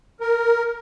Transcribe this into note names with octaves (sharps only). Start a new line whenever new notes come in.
A#4